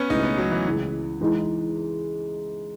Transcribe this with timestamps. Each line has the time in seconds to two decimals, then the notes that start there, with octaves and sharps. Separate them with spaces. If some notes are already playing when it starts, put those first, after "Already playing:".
Already playing: B3 C#4
0.10 C#2 B2 A3 D#4 E4
0.23 B3
0.38 F#3
0.51 E3
0.65 C#2 C#3 E3
1.21 E3 G#3 D#4